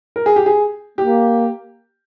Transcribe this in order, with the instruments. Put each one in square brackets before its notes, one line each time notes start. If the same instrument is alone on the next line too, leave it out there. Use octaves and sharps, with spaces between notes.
[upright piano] A#4
G#4
G4
G#4
[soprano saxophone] A#3 [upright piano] G4